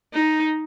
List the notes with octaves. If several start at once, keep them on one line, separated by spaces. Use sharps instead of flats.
D#4